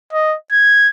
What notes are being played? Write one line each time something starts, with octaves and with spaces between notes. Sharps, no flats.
D#5
G#6